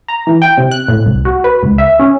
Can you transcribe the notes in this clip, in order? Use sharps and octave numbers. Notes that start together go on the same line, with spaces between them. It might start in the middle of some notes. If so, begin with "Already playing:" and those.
A#5
E3
G5
C3
F#6
A2
C2
F#4
B4
C#2
E5
C#4